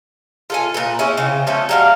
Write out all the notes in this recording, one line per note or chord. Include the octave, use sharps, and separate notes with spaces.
F4 A4 G#5
A#2 B4
C#4 E4 G#4 C#5
C#3 C4
F3 A3 C#4
F#3 G3 F5